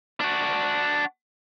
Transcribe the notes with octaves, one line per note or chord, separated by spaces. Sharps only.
D4 F#4